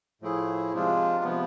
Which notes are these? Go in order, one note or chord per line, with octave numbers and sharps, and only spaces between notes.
A2 F3 A3 E4 G#4
C3 F3 G#3 D4 F4
C3 F3 B3